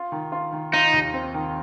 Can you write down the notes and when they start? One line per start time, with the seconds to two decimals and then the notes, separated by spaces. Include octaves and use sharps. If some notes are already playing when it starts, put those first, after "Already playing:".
Already playing: F4
0.12 D#3
0.32 F4
0.52 D#3
0.73 D#4 F4
0.94 D#2
1.13 C4
1.34 D#3